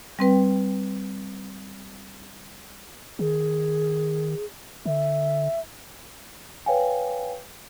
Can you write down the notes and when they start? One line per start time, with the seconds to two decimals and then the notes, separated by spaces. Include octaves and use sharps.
0.19 G3 C4 B4 G5
3.19 D#3 G#4
4.86 D3 E5
6.66 B4 C#5 F5 G5 G#5